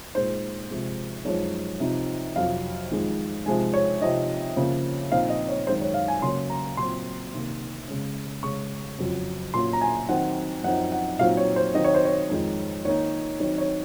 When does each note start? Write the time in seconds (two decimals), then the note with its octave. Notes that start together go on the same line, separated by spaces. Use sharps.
0.15 A#2 G#3 D#4 C5
0.71 C3 F3 G#3
1.25 F#2 F3 G#3 D#4 C#5
1.80 C3 F3 C4 D#4
2.36 F2 C3 F#3 F5
2.91 F2 D#3 G#3
3.46 C3 F3 G#3 D#4 G#5
3.74 C#5
4.01 C3 F3 C4 D#4 D#5
4.56 C#3 F3 A#3 C#4
5.12 A#2 F3 C4 D#4 F5
5.30 D#5
5.49 C#5
5.67 F#2 D#3 G#3 C5
5.81 C#5
5.94 F5
6.08 G#5
6.22 C#3 F#3 A#3 C#4 C6
6.50 A#5
6.77 A#2 F#3 C4 C6
7.32 C3 D#3 A#3
7.88 C#3 G#3 C#4
8.43 C#3 G#3 C#4 C#6
8.99 F2 C#3 F#3
9.54 A#2 F#3 C#4 C6
9.73 A#5
9.81 G#5
10.09 D#3 F#3 C4 D#4 F#5
10.64 F#2 F3 C4 D#4 F#5
10.92 F#5
11.19 A#2 F#3 C4 D#4 F5
11.37 C#5
11.56 C5
11.75 D#3 F#3 C4 D#5
11.84 C#5
11.95 C5
12.05 C#5
12.29 F2 D#3 G#3 D#4
12.85 D#3 A#3 D#4 C#5
13.40 D#3 F#3 C4 D#4 C#5
13.58 C#5